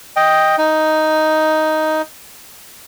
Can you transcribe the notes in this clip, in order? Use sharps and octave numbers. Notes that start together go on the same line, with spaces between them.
D#5 G5
D#4